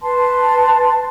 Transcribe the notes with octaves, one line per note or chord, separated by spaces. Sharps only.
B4 A5 C6